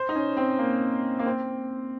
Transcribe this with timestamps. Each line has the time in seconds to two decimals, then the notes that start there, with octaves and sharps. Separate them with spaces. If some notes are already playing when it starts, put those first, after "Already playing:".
Already playing: C5
0.09 D#4
0.15 C#4
0.37 C4
0.59 A#3
1.19 A#3
1.26 C4